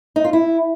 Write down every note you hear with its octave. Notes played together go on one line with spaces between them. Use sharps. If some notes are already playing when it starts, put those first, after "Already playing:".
D#4
F4
E4